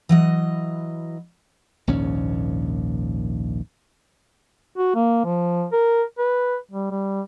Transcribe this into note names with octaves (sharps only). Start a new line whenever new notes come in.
E3 F#3 D#5
A#1 D#2 G#2 C#4
F#4
A#3
F3
A#4
B4
G3
G3